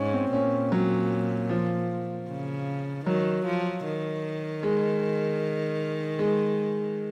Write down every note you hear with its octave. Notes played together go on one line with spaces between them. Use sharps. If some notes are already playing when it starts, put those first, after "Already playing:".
Already playing: G#2 C#4
C4
A#2 C#4
F#3
F3
C#3
D#3 F#3
F3
D#3
G#3
G#3